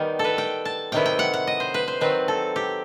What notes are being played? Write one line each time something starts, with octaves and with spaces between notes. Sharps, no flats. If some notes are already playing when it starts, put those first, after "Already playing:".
Already playing: D#3 G3 B3
A4
B4
G5
A5
C3 D#3 F#3 B3 E4 G5
G5
F#5
F#5
D#5
C5
B4
C5
D#3 F#3 C4 B4
A4
G4